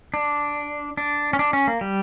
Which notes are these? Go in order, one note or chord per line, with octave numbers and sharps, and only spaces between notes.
D4
D4
C#4
D4
C#4
A#3
G3